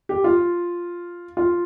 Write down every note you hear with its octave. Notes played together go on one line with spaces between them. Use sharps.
G4
F4
F4